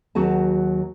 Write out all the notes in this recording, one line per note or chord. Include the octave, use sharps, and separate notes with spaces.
D#2 F#3 F#4 G#4 A5